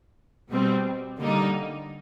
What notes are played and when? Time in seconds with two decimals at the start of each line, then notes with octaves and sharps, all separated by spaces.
0.50 B2 G3 C4
1.21 D3 G3 A#3 D#4